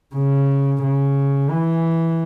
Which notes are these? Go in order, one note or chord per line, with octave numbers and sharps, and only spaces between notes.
C#3
C#3
E3